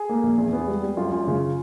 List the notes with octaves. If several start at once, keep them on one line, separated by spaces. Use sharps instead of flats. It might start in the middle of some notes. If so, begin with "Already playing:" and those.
Already playing: G#4
A#3
A#1
E2
B3
G3
G3
F#2 F4
F#2
C#3